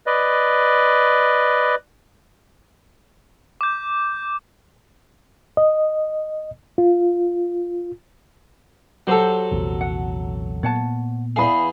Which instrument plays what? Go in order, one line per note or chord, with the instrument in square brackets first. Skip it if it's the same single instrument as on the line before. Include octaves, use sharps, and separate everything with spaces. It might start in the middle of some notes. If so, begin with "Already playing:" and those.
[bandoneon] B4 D5 D#5
[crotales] D6 G6
[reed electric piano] D#5
F4
[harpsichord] F#3 A4 [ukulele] G4 C5
[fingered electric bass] A#1 E2 C3
[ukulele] F#5
[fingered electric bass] A#2 B3 [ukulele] C#5 F#5 A5
[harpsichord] E2 G#4 [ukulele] F5 B5